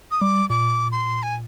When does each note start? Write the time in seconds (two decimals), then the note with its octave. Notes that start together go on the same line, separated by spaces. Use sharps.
0.11 D#6
0.21 G3 D6
0.50 A#2 D6
0.92 C6
1.23 G#5